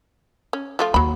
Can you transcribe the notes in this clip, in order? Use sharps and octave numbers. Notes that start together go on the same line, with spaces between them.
C#4
F3 A3 F4
D#2 F#3 B5